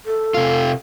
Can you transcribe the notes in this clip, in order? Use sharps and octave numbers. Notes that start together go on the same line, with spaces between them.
A4
C3 F4